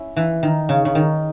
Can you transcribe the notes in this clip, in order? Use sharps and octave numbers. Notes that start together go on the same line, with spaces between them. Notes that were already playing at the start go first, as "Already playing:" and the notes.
Already playing: C#4 E4
E3
D#3
C#3
C#3
D#3